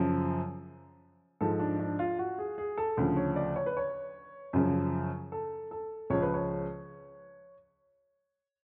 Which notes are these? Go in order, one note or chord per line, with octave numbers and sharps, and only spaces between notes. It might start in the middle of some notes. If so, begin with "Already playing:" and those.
Already playing: F#2 C#3 F3
G#2 F3 A4
D4
D4
F4
F#4
G#4
G#4
A4
D2 C#3 F3
C#5
D5
C#5
B4
C#5
F#2 C#3 F3
A4
A4
C#2 C#3 F3 C#5
B4
C#5